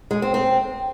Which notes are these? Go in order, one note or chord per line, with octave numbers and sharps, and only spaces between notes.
G#3
C4
C4